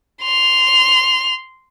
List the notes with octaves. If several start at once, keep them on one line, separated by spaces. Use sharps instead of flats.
C6 F7